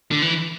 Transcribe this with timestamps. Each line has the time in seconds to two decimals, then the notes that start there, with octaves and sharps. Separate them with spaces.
0.11 D3
0.22 E3